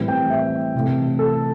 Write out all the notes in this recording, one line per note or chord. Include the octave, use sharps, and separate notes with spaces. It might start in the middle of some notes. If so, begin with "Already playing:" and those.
Already playing: A2 E3 G3 C4
G5
E5
C3 E3 A3
A4